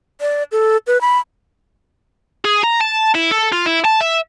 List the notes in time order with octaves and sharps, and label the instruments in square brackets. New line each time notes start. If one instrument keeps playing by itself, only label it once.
[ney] D5
A4
B4
B5
[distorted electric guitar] G#4
A#5
A5
E4
A4
F4
E4
A5
E5